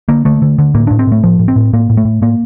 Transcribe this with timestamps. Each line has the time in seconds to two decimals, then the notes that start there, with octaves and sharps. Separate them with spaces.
0.09 D3 A#3
0.25 D3 A3
0.42 D3
0.58 D3
0.74 A2 A#3
0.87 A2 D4
0.99 C4
1.07 A2 A3
1.24 A2 F3
1.39 A2
1.48 C4
1.56 A2
1.73 A2 A#3
1.90 A2
1.97 A3
2.05 A2
2.22 A2 A#3